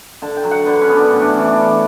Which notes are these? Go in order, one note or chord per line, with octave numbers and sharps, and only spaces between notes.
D3 A5
G5
F#3
F#5
D3 B4
C#4
B3
D4
A2 C#4
D4
E3 C#4
D4
C#4 D4
D4